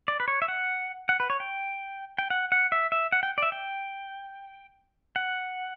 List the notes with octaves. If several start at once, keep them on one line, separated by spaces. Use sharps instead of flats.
D5
B4
C#5
E5
F#5
F#5
B4
C#5
G5
G5
F#5
F#5
E5
E5
F#5
G5
D5
E5
G5
F#5